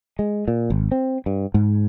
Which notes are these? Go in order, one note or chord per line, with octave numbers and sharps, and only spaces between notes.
G#3
A#2
G#1
C4
G2
G#2